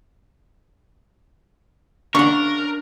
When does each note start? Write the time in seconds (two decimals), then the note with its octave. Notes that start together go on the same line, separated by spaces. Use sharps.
2.15 C#3 D4 A#4 F#5 C#6